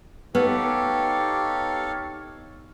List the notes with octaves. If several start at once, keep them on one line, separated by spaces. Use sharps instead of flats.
B3 D#4 G4 A4 C#5 F5